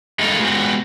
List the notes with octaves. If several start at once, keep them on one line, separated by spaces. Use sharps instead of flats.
G3 G#3 A#3 D#4 A4
G#3 B3 F#4 G4